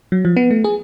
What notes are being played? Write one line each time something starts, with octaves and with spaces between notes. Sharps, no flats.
F#3
F3
B3
A3
G#4